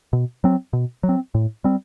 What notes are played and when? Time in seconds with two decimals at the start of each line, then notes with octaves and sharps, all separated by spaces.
0.13 B2
0.44 F#3 C4
0.73 B2
1.03 F#3
1.09 C4
1.35 A2
1.64 G3 C4